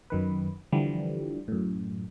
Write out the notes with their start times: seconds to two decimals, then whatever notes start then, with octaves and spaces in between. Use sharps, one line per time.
0.10 F#2 D#3 B4
0.72 D3 E3 F3 G3
1.48 F#2 A2